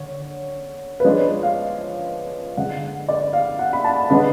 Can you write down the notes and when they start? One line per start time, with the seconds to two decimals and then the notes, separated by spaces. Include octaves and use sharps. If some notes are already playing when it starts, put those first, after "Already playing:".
Already playing: D3 C#5
1.00 B4
1.04 F3 G#3 D4 C#5
1.43 F5
2.57 D3 G#3 D4 F#5
3.09 D5
3.33 F5
3.59 F#5
3.73 B5
3.84 A5
4.10 D3 G#3 B3 D4 B5